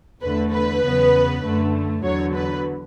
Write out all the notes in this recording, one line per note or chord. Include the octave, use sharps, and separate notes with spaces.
E2 D3 A3 B4
B4
E2 C#3 F#3 B3
F#2 D3 A3
E2 D3 F#3 C#5
B4